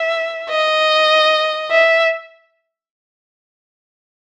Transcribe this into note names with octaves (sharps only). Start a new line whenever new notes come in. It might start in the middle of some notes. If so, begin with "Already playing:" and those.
Already playing: E5
D#5
E5